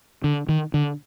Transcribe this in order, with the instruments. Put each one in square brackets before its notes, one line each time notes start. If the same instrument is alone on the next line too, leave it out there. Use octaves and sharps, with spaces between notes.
[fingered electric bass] D3
D#3
D3